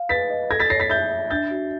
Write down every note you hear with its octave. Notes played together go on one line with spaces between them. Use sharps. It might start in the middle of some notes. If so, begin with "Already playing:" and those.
Already playing: F5
B4 A6 B6
D#5
A4 G#6 A#6
A6 B6
C#5 A#6 C7
A6 B6
E5 G6 A6
E5
D4 G6 A6
F#4